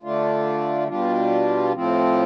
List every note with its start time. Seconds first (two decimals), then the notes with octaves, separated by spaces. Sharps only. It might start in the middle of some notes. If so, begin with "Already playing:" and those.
0.03 D3 A3 D4 F4
0.88 B2 G3 D4 F4
1.73 A2 F3 C4